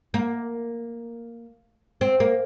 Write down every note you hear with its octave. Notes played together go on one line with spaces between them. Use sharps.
A#3
C4
A#3